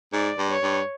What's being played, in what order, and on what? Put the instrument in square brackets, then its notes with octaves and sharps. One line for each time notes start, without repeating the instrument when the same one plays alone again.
[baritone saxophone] G#2 [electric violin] D5
[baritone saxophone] G2
[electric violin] C#5
[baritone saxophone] G2